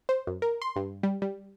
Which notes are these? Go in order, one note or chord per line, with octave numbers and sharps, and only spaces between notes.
C5
F#2
A#4
C6
G2
G3
G3